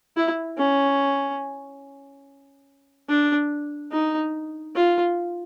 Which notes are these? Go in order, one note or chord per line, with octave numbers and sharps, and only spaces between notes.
E4
C#4
D4
D#4
F4